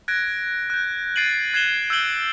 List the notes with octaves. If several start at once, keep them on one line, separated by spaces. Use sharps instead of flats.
F#6 G#6 A#6 D7
F#6 G6
G#6 A6 C7 D7 D#7 F#7
F#6 G#6 C7 E7 G7
G7
E6 G6 G#6 D7 F#7 G7